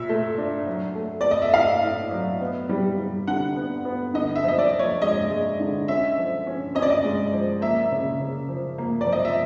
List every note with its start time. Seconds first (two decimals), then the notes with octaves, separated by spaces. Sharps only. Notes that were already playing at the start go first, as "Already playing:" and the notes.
Already playing: A#2 E5
0.09 A3
0.38 D4
0.66 F#3
0.95 A3
1.21 A3 D5
1.31 D#5
1.42 E5
1.54 A2 F5
1.83 A2
2.11 F#3
2.41 B3
2.69 G3
2.98 G3
3.27 D3 F#5
3.56 B3
3.85 B3
4.14 D3 D#5
4.36 E5
4.44 F3 D#5
4.58 D5
4.72 F3
4.79 C#5
5.02 G#3 D#5
5.30 G#3
5.60 D3
5.88 C#4 E5
6.18 F3
6.47 C#4
6.75 C#4 D#5
6.82 D5
6.90 D#5
7.05 G#3
7.33 F3
7.61 A#3 E5
7.92 C#3
8.20 C#3
8.49 F3
8.78 A#3
9.01 D5
9.07 F3
9.13 D#5
9.25 E5